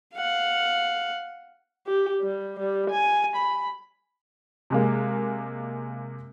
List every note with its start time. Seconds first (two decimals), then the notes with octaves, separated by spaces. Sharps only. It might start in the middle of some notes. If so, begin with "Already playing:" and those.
0.14 F5 F#5
1.87 G4
2.22 G3
2.60 G3
2.90 G#5
3.36 B5
4.70 C3 G#3 A#3